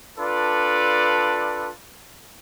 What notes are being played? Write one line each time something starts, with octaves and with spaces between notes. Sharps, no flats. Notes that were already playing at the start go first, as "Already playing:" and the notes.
D4 F4 A4 B4 D5